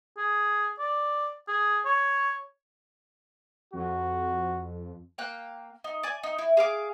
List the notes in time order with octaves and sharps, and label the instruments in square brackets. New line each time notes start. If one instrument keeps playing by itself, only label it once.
[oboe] G#4
D5
G#4
C#5
[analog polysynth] F2 [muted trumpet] F#4
[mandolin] A#3 F5 G5 F#6
D#4
D5 G#5
D#4
E4
G#4 F5 D6